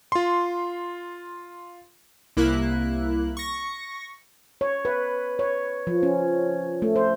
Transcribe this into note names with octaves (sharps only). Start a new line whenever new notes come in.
F4 C6
C2 A#3 E4 F#6
C#6 A#6
C#5
B4
C#5
F3
C#4
A3
C5